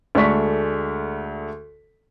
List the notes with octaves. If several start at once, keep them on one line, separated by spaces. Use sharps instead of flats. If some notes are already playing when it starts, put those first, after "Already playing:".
D2 G#3 A4 D5 C#6 B6